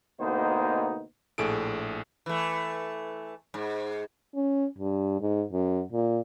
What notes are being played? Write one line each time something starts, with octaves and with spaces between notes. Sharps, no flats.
D2 B2 A#3 B3 D#4 C5
A#1 A2 G#4 A4 D7
E3 A3
G#2
C#4
G2
G#2
F#2
A#2